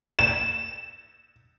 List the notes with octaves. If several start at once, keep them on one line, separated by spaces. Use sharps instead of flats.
E7